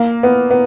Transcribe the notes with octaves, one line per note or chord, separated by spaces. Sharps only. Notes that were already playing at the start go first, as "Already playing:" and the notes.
Already playing: A#3
B3
B3